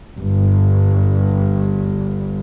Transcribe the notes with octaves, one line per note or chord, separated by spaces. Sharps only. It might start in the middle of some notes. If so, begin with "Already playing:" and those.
G1 G2